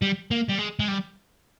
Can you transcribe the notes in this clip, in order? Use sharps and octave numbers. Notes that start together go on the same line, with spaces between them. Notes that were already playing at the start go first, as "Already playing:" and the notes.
G3
A#3
G3
G#3
G#3
G3